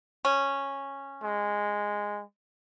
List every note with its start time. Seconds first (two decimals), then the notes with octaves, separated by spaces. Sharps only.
0.25 C#4
1.23 G#3